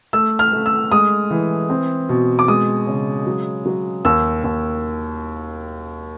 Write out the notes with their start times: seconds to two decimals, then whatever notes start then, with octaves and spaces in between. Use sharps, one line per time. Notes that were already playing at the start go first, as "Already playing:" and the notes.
0.13 A3 E6
0.39 F6
0.52 A3
0.66 E6
0.92 G#3 D#6
1.30 E3
1.70 C4
2.09 B2
2.39 D6
2.48 G#3 D#6
2.87 C#3
3.27 F#3
3.66 F#3
4.05 D#2 E6
4.44 D#2